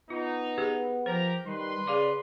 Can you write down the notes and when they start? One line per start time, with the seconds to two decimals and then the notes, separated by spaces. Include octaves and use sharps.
0.10 B3 D#4 F4
0.58 G4 G#4 B4
1.06 F3 G4 A#4 C5 A#5
1.45 D#3 G3 B4 C6
1.87 C#3 G#4 D5 F5 D6